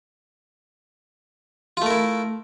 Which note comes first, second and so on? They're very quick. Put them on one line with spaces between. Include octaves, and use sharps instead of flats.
F4 A3 A#4 E4